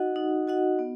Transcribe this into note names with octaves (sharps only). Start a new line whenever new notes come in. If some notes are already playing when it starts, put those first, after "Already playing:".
Already playing: D#4 F#4 D#5 F#5
D#4
F#4 D#5 F#5
B3